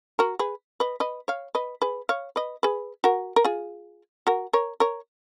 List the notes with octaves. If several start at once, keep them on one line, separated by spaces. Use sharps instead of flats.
F#4 A#4
G#4 B4
B4 D#5
B4 D#5
C#5 F5
B4 D#5
G#4 B4
C#5 F5
B4 D#5
G#4 B4
F#4 A#4
A#4
F4 G#4
F#4 A#4
A#4 C#5
A#4 C#5